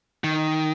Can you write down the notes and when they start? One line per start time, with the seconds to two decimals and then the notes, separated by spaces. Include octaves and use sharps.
0.24 D#3